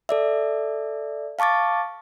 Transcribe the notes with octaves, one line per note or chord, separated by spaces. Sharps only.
A4 D5 E5
F5 A5 C#6 D6 A6